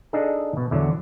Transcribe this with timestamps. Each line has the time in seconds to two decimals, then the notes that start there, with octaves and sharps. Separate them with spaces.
0.13 D4 D#4 G#4 A4
0.57 B2
0.71 E2 D3 F#3